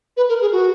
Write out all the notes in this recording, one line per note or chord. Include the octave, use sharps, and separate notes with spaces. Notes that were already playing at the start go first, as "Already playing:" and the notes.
B4
A#4
G#4
F#4